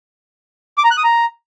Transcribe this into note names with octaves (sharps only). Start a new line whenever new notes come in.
D6
A#5
F#6
D#6
A#5